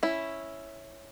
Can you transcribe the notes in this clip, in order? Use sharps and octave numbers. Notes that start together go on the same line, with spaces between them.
C#4 E4